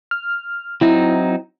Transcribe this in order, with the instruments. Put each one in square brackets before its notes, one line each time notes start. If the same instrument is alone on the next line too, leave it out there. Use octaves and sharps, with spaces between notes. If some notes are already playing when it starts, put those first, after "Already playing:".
[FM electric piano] F6
[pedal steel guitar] F#3 C4 D#4 [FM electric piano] E4